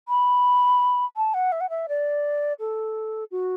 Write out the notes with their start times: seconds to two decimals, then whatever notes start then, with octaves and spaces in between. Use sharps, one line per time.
0.08 B5
1.17 A5
1.34 F#5
1.52 E5
1.60 F#5
1.70 E5
1.88 D5
2.60 A4
3.31 F#4